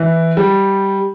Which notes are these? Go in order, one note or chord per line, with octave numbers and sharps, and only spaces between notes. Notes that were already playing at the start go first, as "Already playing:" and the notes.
Already playing: E3
G3